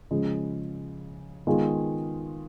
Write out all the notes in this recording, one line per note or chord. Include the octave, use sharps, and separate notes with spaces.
C#3 F3 G#3
D#3 G#3 B3 F4 G#4